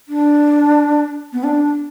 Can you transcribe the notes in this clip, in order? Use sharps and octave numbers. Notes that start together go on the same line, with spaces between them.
D4
B3
D4